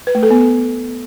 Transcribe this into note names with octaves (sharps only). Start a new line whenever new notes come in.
B4
A3
A4
B3